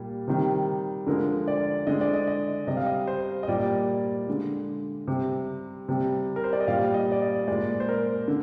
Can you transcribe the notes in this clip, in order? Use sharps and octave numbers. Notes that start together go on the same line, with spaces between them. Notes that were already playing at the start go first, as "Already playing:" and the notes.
Already playing: A#2 G3
C3 D#3 G3
D3 F3 G#3 A#4
D5
D3 G#3 D#5
D5
D#5
D#5
C3 G3 D#5
F5
D#5
C5
D#5
A#2 G3 D5
D3 G#3
C3 G3
C3 G3
A#4
C5
D5
D#5
A#2 G3 F5
D#5
D5
D#5
A#2 G#3 D5
C5
A#4
D3